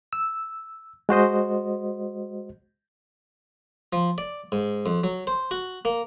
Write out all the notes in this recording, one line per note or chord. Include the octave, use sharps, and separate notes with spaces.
E6
G#3 F#4 C5 D#5
F3
D5
G#2
F2
F#3
C5
F#4
A#3